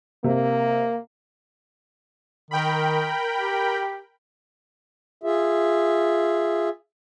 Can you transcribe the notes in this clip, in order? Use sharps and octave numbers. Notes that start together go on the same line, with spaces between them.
C3 A#3
D#3 A#4 G5 B5
G4
F4 G#4 E5